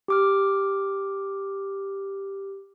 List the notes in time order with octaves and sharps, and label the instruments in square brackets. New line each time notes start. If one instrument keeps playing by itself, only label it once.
[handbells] G4 D6 F6